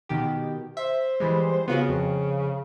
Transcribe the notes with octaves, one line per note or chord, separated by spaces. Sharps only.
B2 D#3 G4
C5 E5
E3 G3 G#3
C#3 B3 F4 F#4
F2